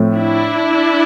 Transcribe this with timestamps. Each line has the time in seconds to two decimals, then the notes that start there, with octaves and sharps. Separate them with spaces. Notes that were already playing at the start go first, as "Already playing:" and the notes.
Already playing: A2 F3 A3 C4
0.15 D4 E4